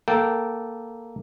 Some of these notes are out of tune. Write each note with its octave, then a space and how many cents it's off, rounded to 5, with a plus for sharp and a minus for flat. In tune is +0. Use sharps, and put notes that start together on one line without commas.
A#3 +0 A4 +0 G5 -20